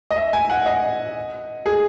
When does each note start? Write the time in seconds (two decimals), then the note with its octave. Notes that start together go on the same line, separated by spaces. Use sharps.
0.11 D#5
0.16 E5
0.33 G#5
0.50 F#5
0.66 D#5
1.66 G#4